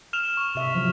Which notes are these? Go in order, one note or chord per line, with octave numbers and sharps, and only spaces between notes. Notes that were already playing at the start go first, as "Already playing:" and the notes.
F6 E7 F7
C#6
C3 E5
F3 F#3